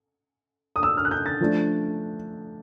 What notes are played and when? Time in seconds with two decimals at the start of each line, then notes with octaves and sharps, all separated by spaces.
0.76 D#6
0.83 E6
0.97 F6
1.05 F#6
1.11 G6
1.26 A6
1.41 F3 A3 D4